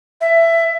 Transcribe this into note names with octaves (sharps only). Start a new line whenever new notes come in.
E5